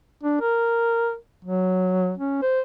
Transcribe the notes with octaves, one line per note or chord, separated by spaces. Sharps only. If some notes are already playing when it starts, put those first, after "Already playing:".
D4
A#4
F#3
C#4
C5